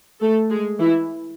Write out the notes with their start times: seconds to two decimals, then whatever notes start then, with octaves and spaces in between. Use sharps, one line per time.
0.21 A3 A4
0.50 G#3 G#4
0.79 E3 E4